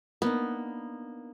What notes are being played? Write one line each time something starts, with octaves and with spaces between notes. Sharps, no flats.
A#3 B3 D4 D#4